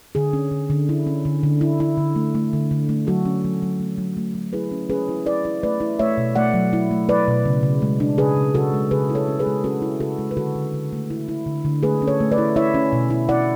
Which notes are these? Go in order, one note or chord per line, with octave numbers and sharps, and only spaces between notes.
D3 G#4
C#4
D3
D3
E4
C#4
D3
D3
E4
E4
D3
A3
A3
D3
D3
A3
F#3 F#4 A4
C#4
F#3
F#3
A3
F#3
A3
F#3
E4 G#4 B4
C#4
C#4 G#4 B4
E4
E4 B4 D5
E4
A3 B4 D5
E4
A3 C#5 E5
B2
A3 D5 F#5
F#3
E4
A3
E4 B4 D5
B2
C#3
C#3
G#3
D4
C#3 G#4 B4
C#3
C#3 F#4 A4
G#3
C#3 G#4 B4
E4
A4 C#5
C#4
G#4 B4
G#3
C#4 F#4 A4
E4
C#3 F#4 A4
G#3
B4
D3 F#4 A4
D3
D3
A3
E4
E4
D3
D3
A3 G#4 B4
C#4
A4 C#5
A3
B4 D5
E4
E4 C#5 E5
C#4
B2
E4
E4 D5 F#5